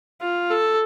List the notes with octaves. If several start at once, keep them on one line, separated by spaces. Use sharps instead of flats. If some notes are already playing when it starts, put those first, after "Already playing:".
F4
A4